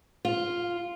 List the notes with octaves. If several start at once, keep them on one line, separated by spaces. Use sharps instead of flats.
F4